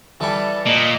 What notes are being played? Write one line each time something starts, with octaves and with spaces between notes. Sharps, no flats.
E3 G3 E4 A4
A#2 D#5